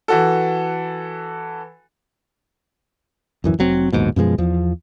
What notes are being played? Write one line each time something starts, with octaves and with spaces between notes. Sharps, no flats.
E3 F#4 A4
D1 F#2 E3
F1 F#3 C4
A#1 D#2 G#2 B2
F#2 B2 F3 G#3
E2 F3